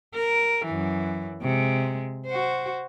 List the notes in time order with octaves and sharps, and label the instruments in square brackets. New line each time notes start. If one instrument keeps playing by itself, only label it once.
[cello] A#4
F#2 E3
C3 G#3
F#4 C5